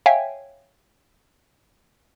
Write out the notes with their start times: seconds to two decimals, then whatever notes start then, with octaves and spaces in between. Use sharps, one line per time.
0.06 C#5 E5 F5 G5 G#5